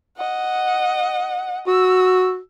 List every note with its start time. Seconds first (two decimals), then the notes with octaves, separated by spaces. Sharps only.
0.17 D#5 F#5
1.67 F#4 E6